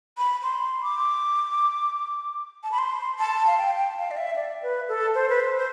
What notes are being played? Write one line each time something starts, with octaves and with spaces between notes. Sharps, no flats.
B5
C6
D6
A5
B5
C6
A5
F5
G5
G5
F5
D5
E5
D5
B4
A4
C5
B4
C5
C5